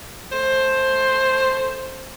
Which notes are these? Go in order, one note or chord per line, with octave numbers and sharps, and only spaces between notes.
A3 C5